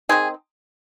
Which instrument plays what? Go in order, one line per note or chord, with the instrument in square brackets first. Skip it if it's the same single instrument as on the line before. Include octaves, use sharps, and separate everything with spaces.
[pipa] D#3 G#3 C4 D#4 G#4